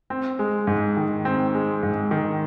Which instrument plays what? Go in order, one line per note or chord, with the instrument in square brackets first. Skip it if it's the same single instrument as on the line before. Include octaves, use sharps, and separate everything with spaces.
[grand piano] C4
G#3
G#2
D#3
C4
G#3
G#2
D#3